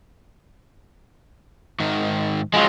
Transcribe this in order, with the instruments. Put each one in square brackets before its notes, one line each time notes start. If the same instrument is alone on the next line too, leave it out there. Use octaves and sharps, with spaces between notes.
[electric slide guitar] G#2 D#3
[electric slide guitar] F3 F#3 [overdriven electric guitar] G#3 F4